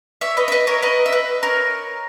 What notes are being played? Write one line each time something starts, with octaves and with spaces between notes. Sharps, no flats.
C#5 E5
B4 D#5
E5
B4 D#5
A#4 C#5
B4 D#5
E5
B4 D#5
A#4 C#5